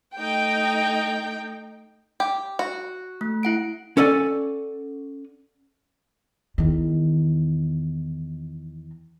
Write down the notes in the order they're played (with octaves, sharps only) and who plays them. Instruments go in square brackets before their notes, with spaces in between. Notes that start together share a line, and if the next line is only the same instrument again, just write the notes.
[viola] A3 D#4 [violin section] G5
[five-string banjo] G4
F#4
[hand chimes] A3
E4 F#5 D7
[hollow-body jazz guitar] C#4 A4 D5 F#5 G#5
[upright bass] E2 D#3